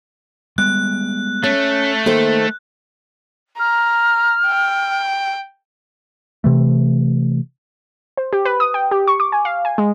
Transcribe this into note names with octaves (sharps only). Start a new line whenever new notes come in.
G3 G#3 B3 F#6
A3 C#4
D#3 A#3 A4 C5
A#5 F6
G5
C3 E3 A3
C5
G4
B4
D#6
G5
G4
C#6
D6
G#5
F5
G#5
G#3